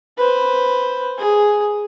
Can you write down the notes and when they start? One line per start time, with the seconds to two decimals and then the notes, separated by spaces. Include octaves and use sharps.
0.18 B4 C5
1.18 G#4